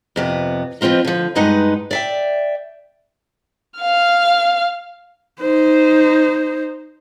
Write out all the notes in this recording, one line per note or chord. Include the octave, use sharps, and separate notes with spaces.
F2 C3 B3
F3 B3 C4 F4 D#5
D3 F3
G2 G#3 D#4 B4 F#5
D5 E5 G5
F5 F6
D#4 C5